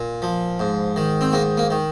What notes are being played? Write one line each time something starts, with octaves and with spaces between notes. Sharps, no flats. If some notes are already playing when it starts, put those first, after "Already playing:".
Already playing: A#2
F3
G#2
D#3
C4
G#2 A#3
A#3
D#3